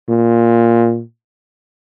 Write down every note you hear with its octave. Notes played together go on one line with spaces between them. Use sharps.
A#2